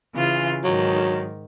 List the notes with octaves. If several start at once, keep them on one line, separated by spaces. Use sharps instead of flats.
C#3 E3 F4
G#2 D#3 F#3